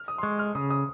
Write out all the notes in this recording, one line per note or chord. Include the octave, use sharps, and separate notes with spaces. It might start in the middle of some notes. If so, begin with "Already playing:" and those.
Already playing: F6
D#6
C6
G#3 C#6
F6
C#3 D#6
D#6